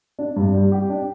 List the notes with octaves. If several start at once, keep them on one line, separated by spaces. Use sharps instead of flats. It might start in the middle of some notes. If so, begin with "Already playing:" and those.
D4
G2
G3
G4
D4